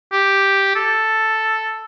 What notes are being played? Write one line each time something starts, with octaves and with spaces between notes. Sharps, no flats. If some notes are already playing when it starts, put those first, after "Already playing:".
G4
A4